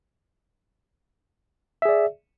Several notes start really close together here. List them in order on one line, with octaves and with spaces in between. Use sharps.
E5 G#4 D5